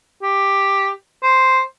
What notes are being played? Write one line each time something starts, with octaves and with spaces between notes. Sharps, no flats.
G4
C5